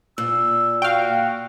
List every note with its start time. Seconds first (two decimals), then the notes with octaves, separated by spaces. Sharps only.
0.18 A#2 E6
0.82 F#4 F5 G5